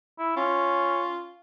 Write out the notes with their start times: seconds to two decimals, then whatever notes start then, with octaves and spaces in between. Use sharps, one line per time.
0.19 E4
0.37 C#4 F4